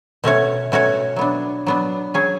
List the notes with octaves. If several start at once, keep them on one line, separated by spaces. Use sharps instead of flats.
B2 A3 C#4 F#4 C#5
B2 A3 C#4 F#4 C#5
F#3 B3 D4
F#3 B3 D4
F#3 C#4 G#4 C#5